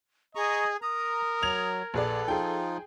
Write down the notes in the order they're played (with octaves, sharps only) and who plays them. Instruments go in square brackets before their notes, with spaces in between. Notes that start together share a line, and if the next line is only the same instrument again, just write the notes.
[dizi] G#4 [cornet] D#5 [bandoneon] A#5 C#6
[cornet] A#4 [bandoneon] A#5 [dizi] D#6
[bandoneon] F#3 [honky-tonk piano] G#6 F7
[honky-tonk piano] A#1 G#4 D5 [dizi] A4 [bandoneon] B4
[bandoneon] F3 D#4 F4 [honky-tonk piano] G#4 G5